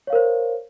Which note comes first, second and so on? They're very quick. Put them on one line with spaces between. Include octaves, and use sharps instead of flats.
C#5 F5 A#4 C5